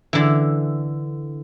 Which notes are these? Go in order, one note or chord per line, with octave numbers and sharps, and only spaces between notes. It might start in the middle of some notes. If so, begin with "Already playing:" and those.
D3 E3